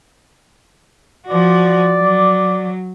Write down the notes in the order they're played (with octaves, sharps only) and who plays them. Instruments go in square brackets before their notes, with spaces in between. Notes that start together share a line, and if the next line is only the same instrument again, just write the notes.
[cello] F3 F#4 [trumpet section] D5
[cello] F#3